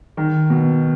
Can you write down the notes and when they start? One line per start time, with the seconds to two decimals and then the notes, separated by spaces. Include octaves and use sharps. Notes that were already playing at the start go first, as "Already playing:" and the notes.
0.17 D#3
0.50 B2